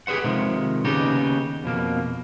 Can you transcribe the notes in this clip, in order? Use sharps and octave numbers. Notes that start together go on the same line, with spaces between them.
G4 G#4 B4 C5 F#5
C3 D#3 F3 G#3
D#2 C#3 B3 D#4 G4
F2 B2 A#3